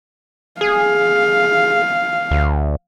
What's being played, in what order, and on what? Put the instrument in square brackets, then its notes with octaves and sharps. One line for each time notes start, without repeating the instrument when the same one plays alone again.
[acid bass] G#4 [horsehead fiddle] F5
[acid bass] D2